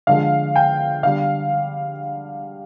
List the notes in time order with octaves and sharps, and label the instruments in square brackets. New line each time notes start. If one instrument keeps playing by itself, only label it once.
[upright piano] D3 F3 G#3 F5
G5
D3 G3 F5